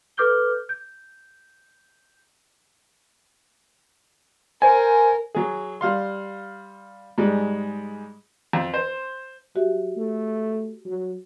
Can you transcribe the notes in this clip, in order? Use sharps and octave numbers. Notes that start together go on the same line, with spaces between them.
A4 B4 D6 F6 G6 G7
G6
A#4 C5 G#5
F#3 G#4
G3 F5 C6
G#2 G3 G#3
F2
C5
F#3 F#4 G4 E5
A3
F#3